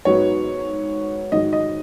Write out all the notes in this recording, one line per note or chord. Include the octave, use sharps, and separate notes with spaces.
G#2 F#3 B3 D#4 C#5
G#2 D#3 F#3 D#5
D#5